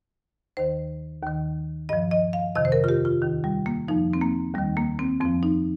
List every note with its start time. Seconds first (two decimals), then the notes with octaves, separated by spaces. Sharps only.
0.57 D#2 D#3 C5
1.23 D#2 D#3
1.89 G2 F3 D#5
2.11 D#5
2.33 F5
2.55 F2 C3 D#3 D#5
2.65 C5
2.72 A#4
2.84 F4
2.89 G4
3.05 F4
3.22 D#2 D#3
3.44 G3
3.66 A#3
3.88 F2 F3 D#4
4.13 C4
4.21 A#3
4.54 D#2 D#3 G3
4.77 A#3
4.99 C4
5.21 F2 F3 C4
5.43 D#4